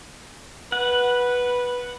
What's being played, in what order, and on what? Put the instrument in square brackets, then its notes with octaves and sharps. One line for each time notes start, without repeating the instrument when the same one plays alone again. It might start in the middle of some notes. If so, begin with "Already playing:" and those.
[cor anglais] B4 [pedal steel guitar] F#5